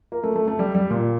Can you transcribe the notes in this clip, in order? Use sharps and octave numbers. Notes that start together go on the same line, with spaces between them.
A#3
A3
A3
A3
G3
G3
A#2